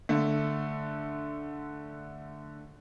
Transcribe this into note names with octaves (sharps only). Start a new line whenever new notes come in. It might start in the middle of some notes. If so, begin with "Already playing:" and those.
D3 A3